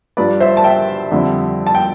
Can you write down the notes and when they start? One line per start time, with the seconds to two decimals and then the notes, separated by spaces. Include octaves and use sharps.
0.17 G2 F3 B4 D5
0.40 C5 E5
0.57 A5
0.64 E5 G5
1.11 F2 D3 G3
1.67 A5
1.75 G5